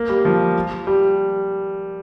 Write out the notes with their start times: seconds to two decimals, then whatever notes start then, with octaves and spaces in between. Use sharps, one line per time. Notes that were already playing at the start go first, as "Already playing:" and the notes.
Already playing: A#3
0.09 G3
0.25 F3
0.87 G3